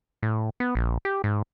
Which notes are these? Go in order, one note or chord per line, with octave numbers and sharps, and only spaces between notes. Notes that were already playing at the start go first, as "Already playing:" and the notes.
A2
B3
A#1
G4
G#2